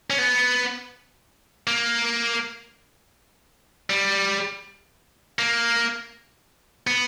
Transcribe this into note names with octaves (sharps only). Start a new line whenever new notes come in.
C#4
B3
A#3
G3
A#3
B3